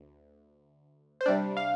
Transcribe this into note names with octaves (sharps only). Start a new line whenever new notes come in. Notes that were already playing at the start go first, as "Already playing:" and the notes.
Already playing: D2
C5
C3 G3 D4 D5
F5